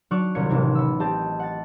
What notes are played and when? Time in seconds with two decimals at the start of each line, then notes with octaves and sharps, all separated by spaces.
0.11 F#3 D4 C#6 D6 F6 F#6
0.35 D#1 C2 C#4 G#6 C#7
0.49 A1 D#2 C3 C#4 G#6
0.75 B3 E6
1.00 C4 G4 C5 D#5 A5
1.39 F#5 A6